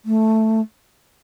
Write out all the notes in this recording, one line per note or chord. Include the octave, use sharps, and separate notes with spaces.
A3